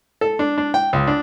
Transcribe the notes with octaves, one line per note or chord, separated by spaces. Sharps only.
A4
D4
D4
G5
C#2
D4